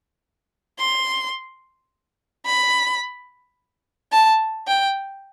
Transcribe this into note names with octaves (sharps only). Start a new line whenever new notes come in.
C6
B5
A5
G5